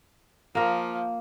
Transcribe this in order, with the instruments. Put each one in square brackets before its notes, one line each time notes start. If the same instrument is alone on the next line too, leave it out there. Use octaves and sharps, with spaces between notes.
[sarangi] F3 [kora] A#3 A#4